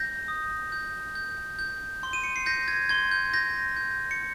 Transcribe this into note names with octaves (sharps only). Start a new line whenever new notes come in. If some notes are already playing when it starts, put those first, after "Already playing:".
Already playing: G6 A#6
D#6
G6
G6
G6
C6
D#7
C#7
C7
G6 A#6
G#6
C6 G#6
G6
G6 A#6
G6
C#7